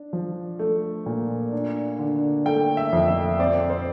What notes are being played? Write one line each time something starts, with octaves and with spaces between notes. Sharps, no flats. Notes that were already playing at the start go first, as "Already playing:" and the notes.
Already playing: D4
F3
A3
A#2
D4
D3
A3 G5
E5
F2
E5
C4 D5
C5